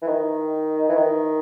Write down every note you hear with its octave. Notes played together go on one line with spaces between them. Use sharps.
E3
D#3
E3
D#3